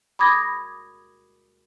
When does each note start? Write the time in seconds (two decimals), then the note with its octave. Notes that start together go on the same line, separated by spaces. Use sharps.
0.19 B5 D6 D#6 G#6 A#6